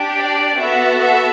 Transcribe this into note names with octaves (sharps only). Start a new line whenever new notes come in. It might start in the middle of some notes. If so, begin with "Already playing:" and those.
Already playing: D4 G4
D5
B3 F#4 A4 E5
E5